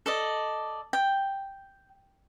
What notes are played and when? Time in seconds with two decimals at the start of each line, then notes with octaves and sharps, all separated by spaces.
0.06 A4 D5 D#5
0.93 G5